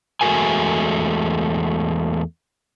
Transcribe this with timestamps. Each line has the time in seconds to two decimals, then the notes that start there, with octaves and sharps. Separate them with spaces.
0.21 E2 G#3 A3 F#4 A#4 G#5